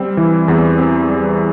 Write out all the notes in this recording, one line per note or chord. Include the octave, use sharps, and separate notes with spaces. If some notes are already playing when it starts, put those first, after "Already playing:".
Already playing: G3 C4
E3
E2
C4
G3